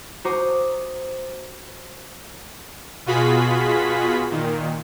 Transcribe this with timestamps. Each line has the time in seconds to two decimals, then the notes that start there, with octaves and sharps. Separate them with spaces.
0.25 F#4 C5 A#5 D6 D#6
3.06 B2 F4 F#4 G#4 B5 B6
4.30 A#2 D#3